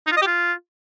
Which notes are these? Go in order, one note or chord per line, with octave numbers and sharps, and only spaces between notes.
D#4
F4
D#5
G4
F4